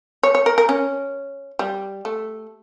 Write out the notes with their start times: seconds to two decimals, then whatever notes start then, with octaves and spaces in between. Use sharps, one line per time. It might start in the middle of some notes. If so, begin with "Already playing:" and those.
0.23 C#5
0.35 C#5
0.46 A#4
0.58 A#4
0.69 C#4
1.59 G3
2.05 A3